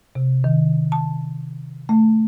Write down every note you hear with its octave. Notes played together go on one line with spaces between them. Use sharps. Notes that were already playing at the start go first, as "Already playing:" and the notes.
C3
D#3
A5
A3